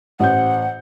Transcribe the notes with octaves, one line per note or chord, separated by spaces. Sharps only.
A1 C5 F#5 G6